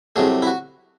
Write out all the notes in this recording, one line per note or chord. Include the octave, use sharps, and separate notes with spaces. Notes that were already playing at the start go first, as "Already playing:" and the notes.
C2 C3 F#3 A3 G#4
E4
F#4